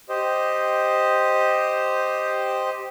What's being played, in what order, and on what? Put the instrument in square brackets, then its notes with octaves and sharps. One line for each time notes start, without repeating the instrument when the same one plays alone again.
[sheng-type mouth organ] G4 C5 D#5